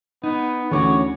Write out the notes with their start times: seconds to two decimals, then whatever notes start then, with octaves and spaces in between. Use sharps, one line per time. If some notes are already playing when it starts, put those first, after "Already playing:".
0.24 B3 D#4
0.71 D2 D3 E3 C#4 F#4 C#5 D6